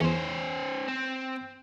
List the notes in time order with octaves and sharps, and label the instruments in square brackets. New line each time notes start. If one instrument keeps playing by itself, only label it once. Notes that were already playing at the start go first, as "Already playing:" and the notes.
[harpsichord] E2 [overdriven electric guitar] C#4 C5
[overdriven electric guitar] C4